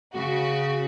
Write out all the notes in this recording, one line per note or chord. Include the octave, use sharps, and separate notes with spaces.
C#3 F#4